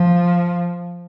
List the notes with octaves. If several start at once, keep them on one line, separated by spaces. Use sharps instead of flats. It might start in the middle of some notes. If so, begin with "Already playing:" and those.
Already playing: F3